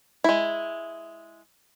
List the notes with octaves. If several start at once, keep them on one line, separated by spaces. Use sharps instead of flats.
G#3 E4